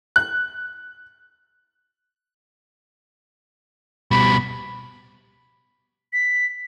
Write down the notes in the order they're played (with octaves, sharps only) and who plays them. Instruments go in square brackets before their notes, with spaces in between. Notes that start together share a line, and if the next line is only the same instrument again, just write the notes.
[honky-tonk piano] F#6
[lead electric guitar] B2 G3 [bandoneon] B5
[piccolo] B6